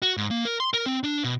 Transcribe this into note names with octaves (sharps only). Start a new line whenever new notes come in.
F#4
G#2
A#3
A#4
C6
A#4
C4
D4
B2